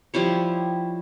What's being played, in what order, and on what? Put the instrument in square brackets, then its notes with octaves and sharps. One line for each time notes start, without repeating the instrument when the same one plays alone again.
[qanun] F3 G3 E4 C#5